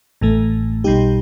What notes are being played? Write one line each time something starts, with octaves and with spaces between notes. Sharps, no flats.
A1 A2 E3 A3
B1 B2 G3 D#4 G4